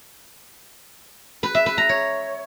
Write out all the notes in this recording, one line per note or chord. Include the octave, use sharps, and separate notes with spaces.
B4
E5
B4
A#5
C#5